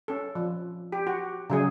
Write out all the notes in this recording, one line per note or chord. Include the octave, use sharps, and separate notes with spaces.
C#4 A4
F3
G4
F#4
C#3 F#3 G#4